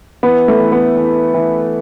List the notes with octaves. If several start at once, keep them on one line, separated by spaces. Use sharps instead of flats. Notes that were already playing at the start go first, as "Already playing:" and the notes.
E3 B3
A3
E3
B3
E3
E3